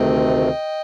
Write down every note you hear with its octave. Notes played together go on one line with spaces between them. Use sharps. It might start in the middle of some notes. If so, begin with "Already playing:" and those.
Already playing: D2 C3 D#3 A3 C4 D#5 G5